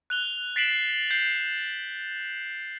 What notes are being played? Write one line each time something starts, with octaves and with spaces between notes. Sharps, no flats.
F#6 F7 G7
A6 B6 C7 D7 E7 F#7
G6 C7